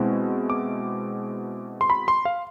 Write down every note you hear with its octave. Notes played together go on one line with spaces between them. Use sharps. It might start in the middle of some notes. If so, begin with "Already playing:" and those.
Already playing: B2 G#3 C4 E4
D6
C6
B5
C6
F5